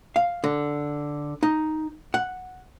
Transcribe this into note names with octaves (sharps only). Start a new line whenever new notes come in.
F5
D3
D#4
F#5